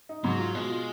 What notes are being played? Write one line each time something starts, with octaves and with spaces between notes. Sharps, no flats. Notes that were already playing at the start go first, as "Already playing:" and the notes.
D#4
G#2 F#3
F4
B2 G#3
F4